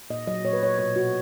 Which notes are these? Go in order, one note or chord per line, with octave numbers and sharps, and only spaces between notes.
A#2 D#5
F#3 D#5
A#2 C#5
B4
A#2 C#5
B2 C#5
B2 F#4